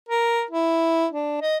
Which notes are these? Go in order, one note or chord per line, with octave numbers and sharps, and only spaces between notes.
A#4
E4
D4
D#5